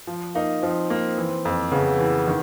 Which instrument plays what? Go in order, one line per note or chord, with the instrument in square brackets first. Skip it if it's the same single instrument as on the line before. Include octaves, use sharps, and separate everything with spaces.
[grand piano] F3
[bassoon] A#3 [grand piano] D#4
[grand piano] F3 [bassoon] C4
[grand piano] A#3
E3
F2
[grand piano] C#3 [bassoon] B3
[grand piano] E3
D#3